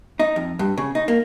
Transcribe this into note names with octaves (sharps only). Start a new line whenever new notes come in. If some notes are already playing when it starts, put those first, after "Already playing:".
D#4
F2
G2
C#3
D#4
A#3